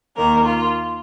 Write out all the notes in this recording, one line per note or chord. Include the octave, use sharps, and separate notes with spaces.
D#2 D#3 A#3 A#4
F4